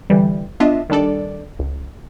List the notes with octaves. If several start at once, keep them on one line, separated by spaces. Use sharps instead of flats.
D3 E3 G3
B3 D4 F4 D#5 E5
D#3 G3 D4 A4 D5
C#2